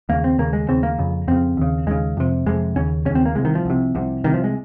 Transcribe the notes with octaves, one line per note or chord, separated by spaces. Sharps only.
D#2 C#3 A#3
C4
D#2 C#3 A#3
G#3
D#2 C#3 C4
A#3
F2 C#3
F2 C#3 C4
D#2 C#3
D#2 C#3 G#3
F2 C3
F2 C3 G#3
D#2 C#3 C#4
D#2 C#3 C#4
C4
A#3
C2 C3 G#3
D#3
F3
C2 C3
C2 C3
C2 C3 D#3
F3
G#3